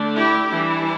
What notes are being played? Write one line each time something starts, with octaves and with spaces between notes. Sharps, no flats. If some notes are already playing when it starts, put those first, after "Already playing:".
Already playing: D3 A3 D4
E4 G4
E3 G3 D4 E4